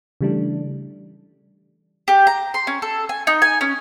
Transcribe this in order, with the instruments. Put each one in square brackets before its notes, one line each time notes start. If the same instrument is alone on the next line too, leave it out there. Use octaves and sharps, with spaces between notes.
[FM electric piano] C#3 E3 G3 A3 D4
[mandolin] G4
A#5
C6
C#4
A4
G#5
D#4
G#5
C#4